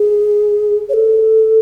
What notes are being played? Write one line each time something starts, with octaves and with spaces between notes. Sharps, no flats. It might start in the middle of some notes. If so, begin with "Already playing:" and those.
Already playing: G#4
C#5
A4